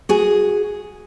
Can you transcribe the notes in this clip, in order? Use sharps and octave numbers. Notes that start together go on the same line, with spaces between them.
F#4 G#4